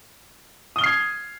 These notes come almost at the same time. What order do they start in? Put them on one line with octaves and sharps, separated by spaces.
D#6 G7 F6 C7 G#6